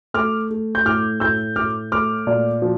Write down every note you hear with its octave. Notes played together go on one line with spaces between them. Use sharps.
A3 D6 F6
A3
G6
A2 D6 F6
A2 E6 G6
A2 D6 F6
A3 D6 F6
A#2
F3